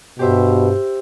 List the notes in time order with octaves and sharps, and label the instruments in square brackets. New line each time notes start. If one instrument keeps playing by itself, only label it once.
[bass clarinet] G2 [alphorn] B2 [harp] G4 C5 E5